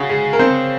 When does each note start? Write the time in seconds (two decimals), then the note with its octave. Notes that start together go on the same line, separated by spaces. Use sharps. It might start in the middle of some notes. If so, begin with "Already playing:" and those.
Already playing: C#3 F#4
0.09 G#3 G#4
0.33 A#4
0.39 C4 C5